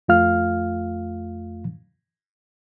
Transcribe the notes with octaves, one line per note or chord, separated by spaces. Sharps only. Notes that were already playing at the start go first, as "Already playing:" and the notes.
F2 A3 F4 F5 F6